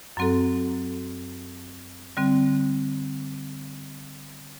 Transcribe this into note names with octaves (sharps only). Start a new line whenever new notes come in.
F#2 F#3 C4 F#4 A4
D3 G3 C4